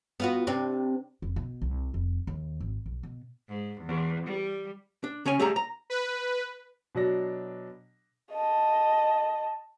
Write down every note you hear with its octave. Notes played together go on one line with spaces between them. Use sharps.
B3 F4 F#4
C3 C4 D4
F1
B2
C2
F1
D#2
G#1
B1
B2
G#2
E2
G3
D4
C#3 C#4 C#5 G#5
G3 A3 G#4 A#5
A#5
B4
B2 F#3 D4 A#6
D#5 A5